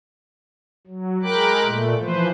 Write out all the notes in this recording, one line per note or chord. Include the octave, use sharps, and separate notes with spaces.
F#3
G#3 A#4 G5 B5 D6 F#6
A#2 A3
E3 F3 B4 C5